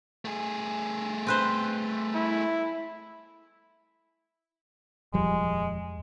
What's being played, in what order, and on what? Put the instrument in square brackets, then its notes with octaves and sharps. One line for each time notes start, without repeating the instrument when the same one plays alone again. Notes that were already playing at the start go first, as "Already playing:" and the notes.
[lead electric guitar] A3 G#4
[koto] C4 B4 C5
[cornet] E4
[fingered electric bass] D#1 F3 G3 [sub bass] F2 [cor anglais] G#3